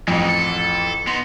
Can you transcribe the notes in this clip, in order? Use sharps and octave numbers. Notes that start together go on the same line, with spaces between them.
A1 F2 G#3 D#4
A4
B3 D#4 C6